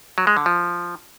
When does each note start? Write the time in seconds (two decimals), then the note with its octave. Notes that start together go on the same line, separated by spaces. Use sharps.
0.18 F#3
0.27 G#3
0.37 D3
0.46 F3